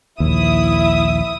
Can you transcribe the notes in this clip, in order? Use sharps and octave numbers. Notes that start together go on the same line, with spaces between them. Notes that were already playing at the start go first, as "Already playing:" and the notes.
A#1 D#2 E4 E5 D#6